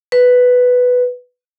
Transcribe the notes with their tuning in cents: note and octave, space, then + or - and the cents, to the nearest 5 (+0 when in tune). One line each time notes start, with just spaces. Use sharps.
B4 +5